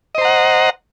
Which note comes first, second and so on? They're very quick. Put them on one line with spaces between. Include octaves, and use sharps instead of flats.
D#5 C5 A#5 F#5